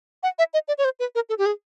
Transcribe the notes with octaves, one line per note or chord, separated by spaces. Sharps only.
F#5
E5
D#5
D5
C#5
C5
B4
A#4
A4
G4
G#4